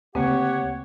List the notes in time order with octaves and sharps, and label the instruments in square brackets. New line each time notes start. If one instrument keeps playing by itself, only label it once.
[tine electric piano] D2 [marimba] C#3 A#3 C4 [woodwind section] G4 C#5 F#5